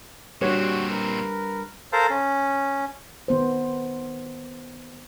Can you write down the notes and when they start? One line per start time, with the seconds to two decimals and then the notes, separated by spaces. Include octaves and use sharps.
0.41 A#2 G3 C4 D4 F#4 G4 C#5
0.91 A#4 B4
1.93 A4 A#4 C5 F5
2.10 C#4
3.28 D#3 B3 C5